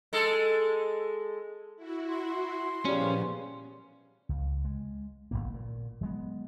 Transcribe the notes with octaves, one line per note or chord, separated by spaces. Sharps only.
G#3 A4
E4 F#4
C6
A#2 C#3 F3 G3 B3 C#4
C#2
G#3
F1 F2 A#3
A#2
F#3 G#3 B3